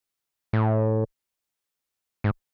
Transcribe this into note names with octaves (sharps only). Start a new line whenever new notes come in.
A2
G#2